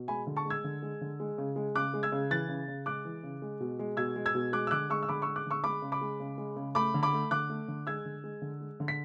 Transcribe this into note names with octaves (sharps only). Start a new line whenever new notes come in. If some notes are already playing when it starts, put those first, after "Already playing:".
Already playing: B2
G#3 G#5 B5
D3
A5 C#6
G#3 E6 G#6
D3
G#3
D3
G#3
C#3
G#3
C#3 D6 F#6
G#3
E6 G#6
C#3
E3 F#6 A6
C#3
C#3
G#3 D6 F#6
E3
C#3
G#3
B2
G#3
B2 E6 G#6
G#3
E6 G#6
B2
G#3 D6 F#6
E6
D3 D6 F#6
G#3 C#6 E6
E6
D3 B5 D6
G#3 C#6 E6
D6 F#6
D3 C#6 E6
G#3 B5 D6
C#3
B5 D6
G#3
C#3
G#3
C#3
A3 B5 D6
D3
B5 D6
A3
D3 D6 F#6
A3
D3
G#3 E6 G#6
D3
G#3
D3
G#3
D3
B6